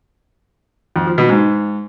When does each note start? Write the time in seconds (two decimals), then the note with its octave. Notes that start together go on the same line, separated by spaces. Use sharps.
0.96 F2
1.07 F3
1.18 B2
1.29 G#2